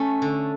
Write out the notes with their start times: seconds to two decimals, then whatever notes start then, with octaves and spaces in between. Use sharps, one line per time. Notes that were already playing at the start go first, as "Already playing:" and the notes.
Already playing: A3 C#4
0.22 D3